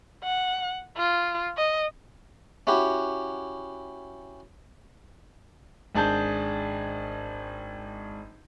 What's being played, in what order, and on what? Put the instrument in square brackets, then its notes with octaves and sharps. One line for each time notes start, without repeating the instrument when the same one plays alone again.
[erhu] F#5
F4
D#5
[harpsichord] C#4 E4 F#4 G4
[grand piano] G#1 D4 G#4 A5 G6